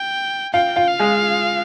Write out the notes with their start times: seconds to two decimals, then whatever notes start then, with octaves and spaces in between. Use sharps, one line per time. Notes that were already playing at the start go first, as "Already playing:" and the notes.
Already playing: G5
0.53 F4 F5 G5
0.76 F4 F5
0.88 F5
0.99 G#3 G#4